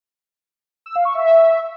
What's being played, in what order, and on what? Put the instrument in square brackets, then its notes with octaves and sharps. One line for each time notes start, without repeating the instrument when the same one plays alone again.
[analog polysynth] E6
F5
C#6
E5